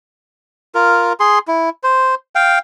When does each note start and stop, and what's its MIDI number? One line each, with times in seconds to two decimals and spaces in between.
0.75 1.13 65
0.75 1.13 70
1.20 1.39 68
1.20 1.39 84
1.48 1.70 64
1.84 2.15 72
2.35 2.59 77
2.35 2.59 79